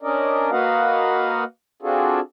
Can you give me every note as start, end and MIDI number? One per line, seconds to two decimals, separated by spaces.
0.02 0.51 61
0.02 0.51 62
0.02 0.51 70
0.02 0.51 74
0.02 0.51 75
0.51 1.44 58
0.51 1.44 66
0.51 1.44 71
0.51 1.44 75
0.51 1.44 77
0.51 1.44 78
1.82 2.20 60
1.82 2.20 62
1.82 2.20 65
1.82 2.20 66
1.82 2.20 68
1.82 2.20 69